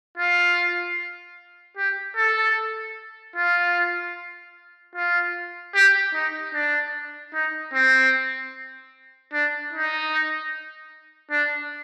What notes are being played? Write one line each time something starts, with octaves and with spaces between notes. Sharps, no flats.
F4
G4
A4
F4
F4
G4
D#4
D4
D#4
C4
D4
D#4
D4